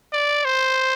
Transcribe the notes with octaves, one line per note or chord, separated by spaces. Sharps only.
D5
C5